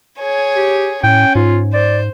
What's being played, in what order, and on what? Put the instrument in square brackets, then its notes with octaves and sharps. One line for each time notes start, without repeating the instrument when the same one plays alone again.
[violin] G#4 C#5
[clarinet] G4
[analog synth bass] A2 [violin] C#4 [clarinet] G5
[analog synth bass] G#2 [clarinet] F4
[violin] C5 [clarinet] D5